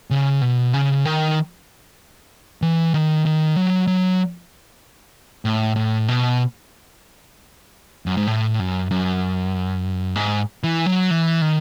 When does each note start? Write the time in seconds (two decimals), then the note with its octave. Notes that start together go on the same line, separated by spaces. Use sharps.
0.11 C#3
0.42 B2
0.73 C#3
1.05 D#3
2.62 E3
2.94 D#3
3.25 D#3
3.57 F#3
3.87 F#3
5.45 A2
5.76 A2
6.08 B2
8.06 F#2
8.17 G#2
8.27 A2
8.59 F#2
8.91 F#2
10.15 G#2
10.64 E3
10.86 F#3
11.11 E3
11.42 D#3